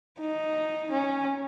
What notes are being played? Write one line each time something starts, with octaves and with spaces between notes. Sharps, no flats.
D#4
C#4